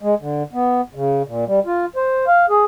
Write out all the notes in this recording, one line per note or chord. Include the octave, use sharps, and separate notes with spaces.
G#3
D3
B3
C#3
A#2
G3
F4
C5
F5
G#4